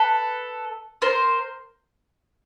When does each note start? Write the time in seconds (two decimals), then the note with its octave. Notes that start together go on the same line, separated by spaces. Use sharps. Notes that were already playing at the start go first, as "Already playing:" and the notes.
Already playing: A4 B4
1.02 A#4 C5